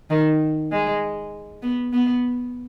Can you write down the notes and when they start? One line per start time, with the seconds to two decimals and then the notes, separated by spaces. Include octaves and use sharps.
0.10 D#3
0.72 G#3
1.62 B3
1.93 B3